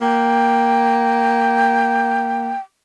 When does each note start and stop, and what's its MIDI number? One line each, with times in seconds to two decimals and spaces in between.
0.01 2.52 58
0.01 2.60 79